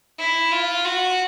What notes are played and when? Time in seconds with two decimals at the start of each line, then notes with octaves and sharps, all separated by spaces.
0.18 E4
0.52 F4
0.85 F#4